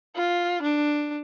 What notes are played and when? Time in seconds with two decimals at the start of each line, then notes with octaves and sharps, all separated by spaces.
0.16 F4
0.63 D4